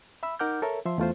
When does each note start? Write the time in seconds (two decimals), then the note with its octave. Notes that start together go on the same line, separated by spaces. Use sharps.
0.23 E5 B5 E6
0.39 D#4 A#4 F#5 D6 F6 G6
0.62 A4 A#4 C#5 E5
0.85 F3 E5 C6
0.98 E2 A3 F4 C5